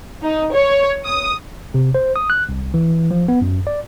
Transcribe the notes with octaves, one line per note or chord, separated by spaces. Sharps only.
D#4
C#5
D#6
C3
C5
D#6
F#6
C2
E3
F3
B3
F#2
D5